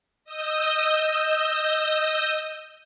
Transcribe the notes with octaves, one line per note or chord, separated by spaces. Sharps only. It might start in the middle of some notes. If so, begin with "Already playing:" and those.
D#5 D#6 E6 G6